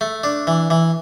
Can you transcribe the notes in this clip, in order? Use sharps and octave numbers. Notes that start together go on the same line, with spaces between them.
A3
D4
E3
E3